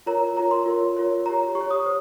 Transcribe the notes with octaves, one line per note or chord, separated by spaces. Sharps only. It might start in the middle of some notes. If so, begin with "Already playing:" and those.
F4 A#4 C#5 A#5
F4 A#4 C#5 A#5
C6
F4 A#4 C#5
F4 A#4 C#5
G4 C#5 A#5
G4 C#6
C#5
D#6
C5